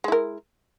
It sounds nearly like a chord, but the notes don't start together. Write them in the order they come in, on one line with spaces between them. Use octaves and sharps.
G#3 E4 A#4